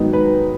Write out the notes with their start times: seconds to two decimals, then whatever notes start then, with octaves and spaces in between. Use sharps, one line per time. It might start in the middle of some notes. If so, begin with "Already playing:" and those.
Already playing: G#2 D#3 F#3 B3 D#4
0.13 B4